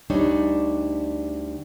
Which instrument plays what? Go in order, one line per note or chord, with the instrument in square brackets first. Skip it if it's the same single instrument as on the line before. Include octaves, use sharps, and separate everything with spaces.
[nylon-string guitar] D2 G3 D4 D#4 C#5